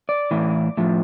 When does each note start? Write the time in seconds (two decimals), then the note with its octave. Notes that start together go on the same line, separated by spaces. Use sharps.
0.09 D5
0.31 A2 E3
0.77 A2 F3